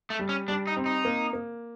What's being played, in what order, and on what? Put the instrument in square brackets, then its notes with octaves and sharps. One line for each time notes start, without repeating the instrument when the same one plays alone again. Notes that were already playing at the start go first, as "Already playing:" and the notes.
[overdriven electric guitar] A3
[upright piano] G3
[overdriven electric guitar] C#4
[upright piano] G3 [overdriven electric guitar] D4
[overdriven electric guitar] D#4
[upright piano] C4
[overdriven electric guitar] D#4
[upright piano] A#3
A#3